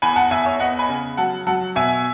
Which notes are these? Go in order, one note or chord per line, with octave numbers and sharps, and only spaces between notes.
E2 G#5 B5
F#5 A5
E2 E5 G#5
C#5 E5
B3 D#5 F#5
G#5 B5
C#3
F#3 F#5 A5
F#3 F#5 A5
B2 E5 G#5